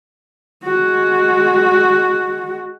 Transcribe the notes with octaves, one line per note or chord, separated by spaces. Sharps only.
G#3 F#4